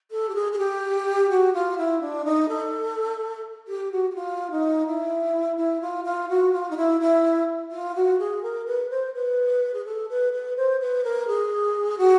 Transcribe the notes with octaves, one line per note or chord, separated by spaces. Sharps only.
A4
G4
G#4
G#4
G4
F#4
F4
E4
D4
D#4
A4
G4
F#4
F#4
F4
D#4
E4
E4
F4
F4
F#4
F4
D#4
E4
E4
F4
F#4
G#4
A#4
B4
C5
B4
G#4
A4
B4
B4
C5
B4
A#4
G#4
F#4